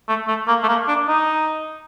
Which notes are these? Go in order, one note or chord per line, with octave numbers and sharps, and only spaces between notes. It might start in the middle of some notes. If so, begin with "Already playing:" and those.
A3
A3
A#3
A3
A#3
D4
D#4